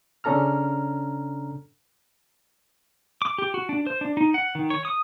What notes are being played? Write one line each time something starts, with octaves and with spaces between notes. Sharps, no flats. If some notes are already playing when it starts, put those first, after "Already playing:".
C#3 C#4 D4 A4 A#5 F6
D6
G4
F#4
D4
C5
D4
D#4
F#5
D#3
C#5
D#6